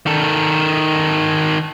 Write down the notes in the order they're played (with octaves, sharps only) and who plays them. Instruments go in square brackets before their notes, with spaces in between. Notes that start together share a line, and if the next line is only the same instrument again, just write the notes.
[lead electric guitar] D#3 A4